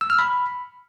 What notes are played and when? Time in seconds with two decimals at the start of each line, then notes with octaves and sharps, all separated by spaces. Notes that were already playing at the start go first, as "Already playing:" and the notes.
0.01 E6
0.10 F6
0.19 B5